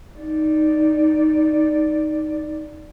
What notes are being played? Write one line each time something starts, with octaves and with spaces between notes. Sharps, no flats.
D#4 D5